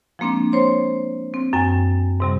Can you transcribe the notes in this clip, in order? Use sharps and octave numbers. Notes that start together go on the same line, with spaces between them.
F3 G#3 A#3 C4 D4
C5 C#5 C6
C4
F#2 G5 G#5
G#2 C3 G3